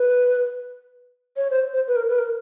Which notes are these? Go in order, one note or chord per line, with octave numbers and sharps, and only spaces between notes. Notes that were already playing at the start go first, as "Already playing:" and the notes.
Already playing: B4
C#5
C5
C5
B4
A#4
B4
A#4